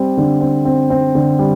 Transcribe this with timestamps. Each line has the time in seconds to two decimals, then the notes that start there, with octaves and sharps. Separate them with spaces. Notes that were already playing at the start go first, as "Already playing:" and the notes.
Already playing: G3 C4
0.17 D3
0.41 C4
0.65 C4
0.90 C4
1.15 D3
1.39 G3